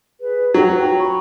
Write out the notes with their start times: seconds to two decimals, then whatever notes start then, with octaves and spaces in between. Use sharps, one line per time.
0.20 G#4 B4
0.54 F#3 C#5 G5 A#5
0.98 A#5 B5 C#6